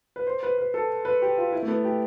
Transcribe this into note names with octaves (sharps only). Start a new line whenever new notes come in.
B4
C5
B4
B4
A4
B4
G4
F4
E4
A3
B3
G4